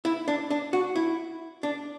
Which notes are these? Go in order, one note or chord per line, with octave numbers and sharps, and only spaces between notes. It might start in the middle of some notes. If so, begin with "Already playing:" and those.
E4
D4
D4
F#4
E4
D4